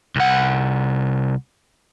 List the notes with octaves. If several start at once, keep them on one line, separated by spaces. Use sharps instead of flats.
C2 F#5